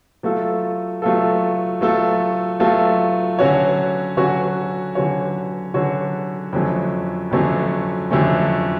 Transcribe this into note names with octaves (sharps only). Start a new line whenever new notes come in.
F#3 A3 F4 A4
F#3 A3 F4 A4
F#3 A3 F4 A4
F#3 A3 F4 A4
D3 F#3 C#4 F#4 C#5
D3 F#3 C#4 F#4 C#5
D3 F#3 C#4 F#4 C#5
D3 F#3 C#4 F#4 C#5
F2 D3 F#3 A3 C#4
F2 D3 F#3 A3 C#4
F2 D3 F#3 A3 C#4